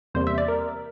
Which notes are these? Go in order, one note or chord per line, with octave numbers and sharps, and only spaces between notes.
E2 C3 G3 A#3 C5
E5
D5
A#4